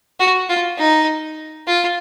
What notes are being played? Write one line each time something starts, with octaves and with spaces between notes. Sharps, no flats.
F#4
F4
D#4
F4